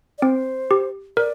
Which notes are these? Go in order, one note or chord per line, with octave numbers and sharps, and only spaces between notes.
D5
C4 C5
G4
A#4 D5